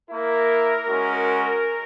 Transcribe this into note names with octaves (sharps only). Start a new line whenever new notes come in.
A#3 E4 A#4
G#3 C#4 F#4